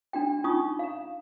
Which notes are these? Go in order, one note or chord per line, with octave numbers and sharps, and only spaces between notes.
D4 F#4 G5
C#4 D#4 F4 C#6 D#6
F5 A#5